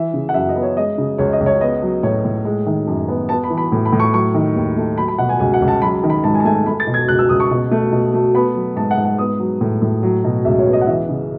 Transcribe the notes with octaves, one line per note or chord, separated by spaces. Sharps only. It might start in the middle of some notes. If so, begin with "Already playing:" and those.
Already playing: E3 E5
C#3
F#5
F#2 E5
D#5
B3
C#5
G#3 D#5
C#3
C#2 C#5
D#5
C#2
C#5
B3 D#5
F#3
A2 C#5
A2
G#3
D#3
F#2
B3
B3 A5
B5
E3
B5
A2
B5
A2
C#6
F#3 C#6
D#3
D#2
A3
F#3 B5
B5
B2 F#5
G#5
C#2 G#5
F#5
C#2
A5
F#3 B5
D#3
B5
G#2 A5
G#5
A5
A3 G#5
A5
A3 B5
A6
B2
G#6
C#2 F#6
E6
C#2 D#6
C#6
B2
A3
B2
A3
B3 B5
F#3
G#2 A5
F#5
G#2
F#5
B3 D#6
F#3
A2
A2
F#3
B2
C#2 E5
C#5
B3
D#5
F#5
E3 E5
C#3